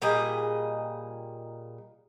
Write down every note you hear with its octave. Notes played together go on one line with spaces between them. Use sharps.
A#2 G3 G#4 D#5